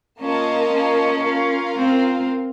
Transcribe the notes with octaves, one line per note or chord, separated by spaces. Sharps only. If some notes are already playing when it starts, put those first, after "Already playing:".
A#3 C#4 F4 A#4 D#5 A5
C#4
F4 A#4 F5
C4